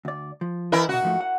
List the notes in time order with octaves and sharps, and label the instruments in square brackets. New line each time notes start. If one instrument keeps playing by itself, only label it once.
[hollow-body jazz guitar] D2 D5
F3
[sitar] E3 E4 A#4 [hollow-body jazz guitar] D#5 G#5
[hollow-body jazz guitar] C2 B2 [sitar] F#4
[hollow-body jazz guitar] G#2 F3 A3
F#5